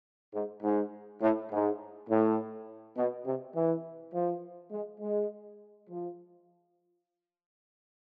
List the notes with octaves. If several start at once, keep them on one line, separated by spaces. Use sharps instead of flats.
G#2
G#2
A2
G#2
A2
B2
C3
E3
F3
G#3
G#3
F3